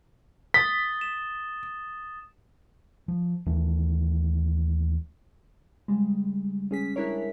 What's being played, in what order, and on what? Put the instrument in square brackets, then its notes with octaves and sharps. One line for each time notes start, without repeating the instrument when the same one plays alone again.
[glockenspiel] D#6 A6 G7 [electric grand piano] B6
[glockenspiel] E7
[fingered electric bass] F3
D#2 E3 A3
[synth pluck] C#3 G3 G#3
C#4 G#4 B6
D4 E4 G#4 A#4 C#5